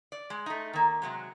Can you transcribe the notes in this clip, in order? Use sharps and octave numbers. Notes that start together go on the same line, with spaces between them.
D5
G#3
A3 D#4
D#3 A#3
C3 F#3 G#3